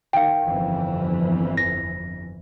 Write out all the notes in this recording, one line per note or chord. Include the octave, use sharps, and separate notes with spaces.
D#3 F5 G5
G1 F2 E3
A#6